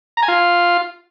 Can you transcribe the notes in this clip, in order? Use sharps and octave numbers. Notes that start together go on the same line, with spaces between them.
A#5
G#5
F4